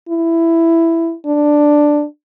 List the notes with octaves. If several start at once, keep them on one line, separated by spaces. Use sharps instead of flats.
E4
D4